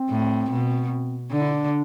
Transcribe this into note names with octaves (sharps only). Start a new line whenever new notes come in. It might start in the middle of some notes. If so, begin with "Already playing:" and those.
Already playing: C4
A2
B2
D3 D4
E4
D4